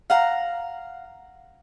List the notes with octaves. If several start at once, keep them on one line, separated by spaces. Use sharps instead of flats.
F5 F#5 A#5